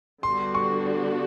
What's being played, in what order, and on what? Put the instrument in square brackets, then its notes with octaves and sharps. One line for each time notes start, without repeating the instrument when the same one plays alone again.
[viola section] D3 G3 B3 D4 F#4 [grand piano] C6
[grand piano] C#6